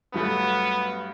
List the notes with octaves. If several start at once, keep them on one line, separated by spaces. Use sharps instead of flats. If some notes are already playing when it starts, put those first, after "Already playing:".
G2 F#3 A3 B3